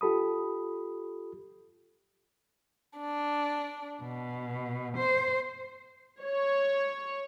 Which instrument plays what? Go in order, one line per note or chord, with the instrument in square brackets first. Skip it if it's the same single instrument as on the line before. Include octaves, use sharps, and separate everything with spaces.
[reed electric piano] F4 G4 A4 B5 D#6
[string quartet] D4
B2
C5
[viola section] C#5